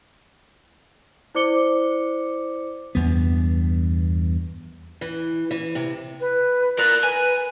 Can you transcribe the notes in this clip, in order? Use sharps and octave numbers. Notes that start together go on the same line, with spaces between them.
E4 C5 D5 D6 C#7 G7
E2 G2 B3
E3
E3
C3
B4
A#4 D5 F#6
B4 G#5